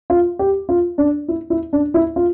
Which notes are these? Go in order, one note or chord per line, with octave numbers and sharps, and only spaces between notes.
F4
G4
F4
D4
E4
E4
D4
E4
F4